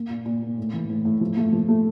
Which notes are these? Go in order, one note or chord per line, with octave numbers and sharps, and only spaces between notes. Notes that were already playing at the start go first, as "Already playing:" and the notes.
Already playing: A#3
A#2
A#2
A#3
A2
E3
A2
A2
F3
A3
F3
A3